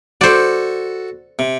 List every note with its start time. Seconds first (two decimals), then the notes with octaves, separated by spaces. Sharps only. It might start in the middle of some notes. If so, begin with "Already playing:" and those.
0.21 F#4 A4 C5 D5
1.39 C3